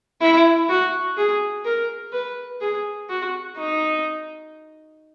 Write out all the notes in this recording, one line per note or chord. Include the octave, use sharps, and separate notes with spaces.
E4
F#4
G#4
A#4
B4
G#4
F#4
D#4